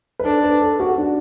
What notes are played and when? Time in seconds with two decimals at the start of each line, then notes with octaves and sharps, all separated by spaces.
0.19 B4
0.24 D4 A4
0.43 B4
0.62 A4
0.80 F#4
0.98 D4